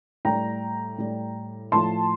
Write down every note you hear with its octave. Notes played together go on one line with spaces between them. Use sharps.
A2 G3 G5 A#5
A2 G3
A2 F3 A5 C6